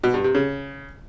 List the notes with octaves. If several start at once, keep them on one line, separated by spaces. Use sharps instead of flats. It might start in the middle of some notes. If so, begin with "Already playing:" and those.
B2
G2
C3
C#3